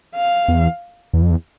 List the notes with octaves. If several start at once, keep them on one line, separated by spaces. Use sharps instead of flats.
F5
E2
E2
F2
E2